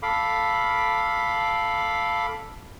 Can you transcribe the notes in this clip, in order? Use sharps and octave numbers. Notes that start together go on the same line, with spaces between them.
A4 F5 B5 D6